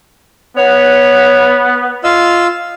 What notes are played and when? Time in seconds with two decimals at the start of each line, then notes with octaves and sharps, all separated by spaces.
0.57 B3 C#5
2.04 F4 D#5 F5 E6